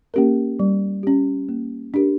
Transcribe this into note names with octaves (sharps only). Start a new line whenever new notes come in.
A#3 C#4 G4 A#4
G3
C#4 G4
A#3
D4 G4 A#4